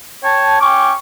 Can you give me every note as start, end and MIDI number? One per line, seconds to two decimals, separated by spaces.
0.24 0.57 73
0.24 0.56 79
0.24 0.56 81
0.61 0.93 61
0.61 0.93 79
0.61 0.93 85
0.61 0.91 86